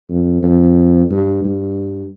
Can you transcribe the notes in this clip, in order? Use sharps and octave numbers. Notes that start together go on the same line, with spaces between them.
F2
F2
G2
G2